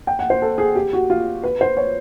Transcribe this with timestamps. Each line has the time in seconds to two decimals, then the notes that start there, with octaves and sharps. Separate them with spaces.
0.07 G5
0.19 F#5
0.30 C5
0.42 A4
0.58 G#4
0.76 G4
0.93 F#4
1.10 F4
1.44 B4
1.61 C5
1.77 C#5